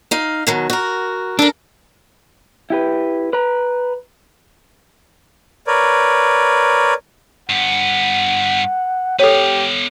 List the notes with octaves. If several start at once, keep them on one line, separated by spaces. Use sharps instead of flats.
D#4 F5
B2 D#3 F#3
F#4 A#4
D4 A4 A#4
E4 G4 B4
B4 A#5
A#4 B4 C#5 D5
G2 B3 F#5
B3 G4 A4 C#5 F5